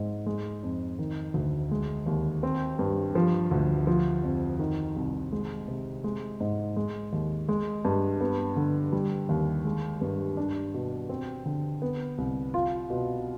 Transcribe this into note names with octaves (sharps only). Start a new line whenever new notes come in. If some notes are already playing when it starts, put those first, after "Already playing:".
Already playing: G#2 G#3
G#3
F2
D#3
D2
G#3
D#2
C4
G2
F3
D2
F3
F2
D#3
C2
G#3
C3
G#3
G#2
G#3
D#2
G#3
G2
B3
D3
G3
D#2
G#3
G2
D4
B2
C4
D3
B3
C2
F4
B2